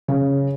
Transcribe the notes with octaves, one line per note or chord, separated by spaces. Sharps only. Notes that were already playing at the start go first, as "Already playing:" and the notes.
C#3